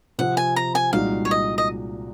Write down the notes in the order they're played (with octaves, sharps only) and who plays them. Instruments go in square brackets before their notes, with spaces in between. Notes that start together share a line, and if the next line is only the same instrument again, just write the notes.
[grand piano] C3 F3 C4 [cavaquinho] F#5
[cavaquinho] G#5
A#5
G#5
[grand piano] C2 A#2 G#3 D#4 F#4 [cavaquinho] F5
[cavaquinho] C#5
D#5
D#5